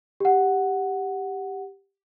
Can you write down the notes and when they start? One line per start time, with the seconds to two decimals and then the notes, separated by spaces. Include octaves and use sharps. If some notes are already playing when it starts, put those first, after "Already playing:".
0.20 G4 F#5